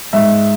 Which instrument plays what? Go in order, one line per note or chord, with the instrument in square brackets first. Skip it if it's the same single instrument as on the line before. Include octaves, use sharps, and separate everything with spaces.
[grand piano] G#2 E5